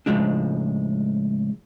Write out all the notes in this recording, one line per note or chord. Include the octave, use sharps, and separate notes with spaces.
C#2 A2 C3 F3 G#3 D4